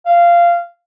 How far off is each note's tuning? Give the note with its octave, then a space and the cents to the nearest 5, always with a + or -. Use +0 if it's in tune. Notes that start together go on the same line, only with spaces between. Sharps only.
F5 -15